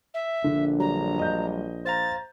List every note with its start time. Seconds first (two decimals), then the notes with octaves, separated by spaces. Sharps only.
0.14 E5
0.44 A#1 D3
0.79 F#3 G3 A#5
1.19 D#5 G6
1.85 C5 F5 A#5 A6